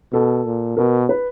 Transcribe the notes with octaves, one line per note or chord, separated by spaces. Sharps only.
B2 A4
A#2
B2 A#4
B4